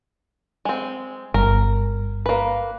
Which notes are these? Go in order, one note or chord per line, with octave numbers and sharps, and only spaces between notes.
G#3 C4
G1 A#4
A#3 B4